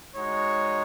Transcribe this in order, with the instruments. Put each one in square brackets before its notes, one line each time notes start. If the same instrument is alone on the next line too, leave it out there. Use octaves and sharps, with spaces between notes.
[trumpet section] G#3 D#4 F#4 C#5